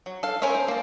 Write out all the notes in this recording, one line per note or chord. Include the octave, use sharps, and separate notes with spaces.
F#3
A4 F5
C#4 A#4 C5 C#5 E5
C5
A#3 A5